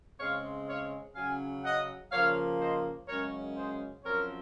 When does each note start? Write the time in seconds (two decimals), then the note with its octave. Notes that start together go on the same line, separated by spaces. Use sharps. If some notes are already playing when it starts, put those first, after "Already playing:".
0.19 C#3 G#3 C4 C#5 F5
0.68 C#5 F5
1.15 C#3 F#3 C#4 F5 G#5
1.63 D#5 F#5
2.11 C#3 F3 A#3 C#5 F5
2.60 C5 D#5
3.08 F#2 C#3 G#3 C#4 A#4 C#5
3.56 G#4 C5
4.04 F#2 F3 C4 A#4 C#5